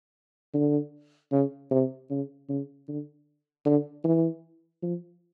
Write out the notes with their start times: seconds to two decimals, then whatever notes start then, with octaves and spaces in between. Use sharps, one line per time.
0.54 D3
1.32 C#3
1.71 C3
2.10 C#3
2.49 C#3
2.88 D3
3.66 D3
4.04 E3
4.83 F3